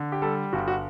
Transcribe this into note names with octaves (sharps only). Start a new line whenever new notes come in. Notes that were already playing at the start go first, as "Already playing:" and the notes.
Already playing: D3
G4
G3 A4
G1 F#4
F#4